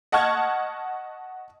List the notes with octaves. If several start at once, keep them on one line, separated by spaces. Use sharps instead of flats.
D#5 F#5 A5 C#6 F6 G#6